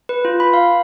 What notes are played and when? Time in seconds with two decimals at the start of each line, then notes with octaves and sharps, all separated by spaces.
0.09 B4
0.25 F4
0.40 B5
0.53 F5